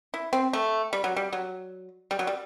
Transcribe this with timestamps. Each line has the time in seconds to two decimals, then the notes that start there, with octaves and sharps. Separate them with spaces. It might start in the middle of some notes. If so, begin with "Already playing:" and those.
0.14 E4
0.33 C4
0.53 A3
0.93 G3
1.04 F#3
1.16 G3
1.33 F#3
2.11 G3
2.19 F#3
2.27 G3